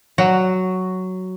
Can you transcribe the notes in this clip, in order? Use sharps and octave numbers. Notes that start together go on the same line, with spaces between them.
F#3 F#4